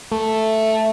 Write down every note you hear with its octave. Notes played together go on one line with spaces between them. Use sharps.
A3